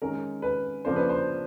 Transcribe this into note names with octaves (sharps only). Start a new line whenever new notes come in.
D#3 G#3 C#4 A#4
B4
C#3 F3 A#3 D4 C5
B4
C5